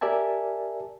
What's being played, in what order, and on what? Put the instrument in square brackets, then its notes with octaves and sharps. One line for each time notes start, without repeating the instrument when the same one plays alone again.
[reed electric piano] G4 A#4 D5 E5 G#5 A5